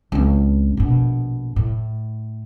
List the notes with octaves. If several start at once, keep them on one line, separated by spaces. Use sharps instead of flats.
C#2 C4
A#1 B2
A2